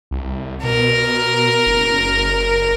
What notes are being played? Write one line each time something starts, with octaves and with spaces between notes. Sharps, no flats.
C2
B2 A#4
F#1